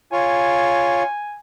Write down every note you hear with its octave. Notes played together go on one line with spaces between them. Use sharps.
F4 C#5 G#5